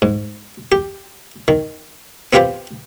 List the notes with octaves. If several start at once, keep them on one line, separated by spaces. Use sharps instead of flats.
G#2
G4
D#3
B3 C4 F4 G4 B4 C5